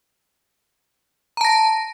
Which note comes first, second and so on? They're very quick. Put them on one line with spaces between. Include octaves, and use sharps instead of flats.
A#5 A5 A#6